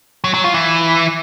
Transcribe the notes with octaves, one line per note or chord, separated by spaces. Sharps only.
F#3
F#3
F4
E3